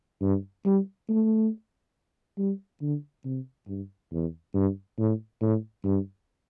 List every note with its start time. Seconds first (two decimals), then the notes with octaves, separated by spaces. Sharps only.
0.22 G2
0.66 G3
1.09 A3
2.38 G3
2.82 D3
3.25 C3
3.68 G2
4.12 E2
4.54 G2
4.99 A2
5.42 A2
5.85 G2